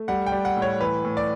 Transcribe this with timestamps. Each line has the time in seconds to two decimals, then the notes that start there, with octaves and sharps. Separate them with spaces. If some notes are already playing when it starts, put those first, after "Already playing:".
Already playing: A3
0.08 G3 F#5
0.26 G5
0.32 G3
0.45 F#5
0.57 A2
0.62 C#5
0.80 E3 B4
1.05 A2
1.17 D5